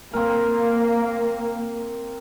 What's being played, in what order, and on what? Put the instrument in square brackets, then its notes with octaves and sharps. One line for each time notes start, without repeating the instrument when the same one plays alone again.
[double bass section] A#3 [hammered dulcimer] C4 A#4